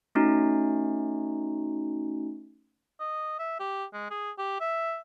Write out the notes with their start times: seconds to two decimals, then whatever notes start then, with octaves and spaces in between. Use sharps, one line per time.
0.15 A3 C#4 D#4 F#4
3.00 D#5
3.39 E5
3.60 G4
3.93 G#3
4.10 G#4
4.38 G4
4.60 E5